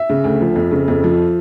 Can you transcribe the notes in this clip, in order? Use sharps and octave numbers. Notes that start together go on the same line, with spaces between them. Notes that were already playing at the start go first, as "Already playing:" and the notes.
Already playing: E5
C#3
D2
F3
F2
C#3
F2
F3